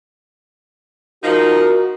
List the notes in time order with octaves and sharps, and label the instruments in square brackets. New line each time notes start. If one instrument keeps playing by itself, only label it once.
[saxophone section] F3 D#4 [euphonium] F#4 [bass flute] A#4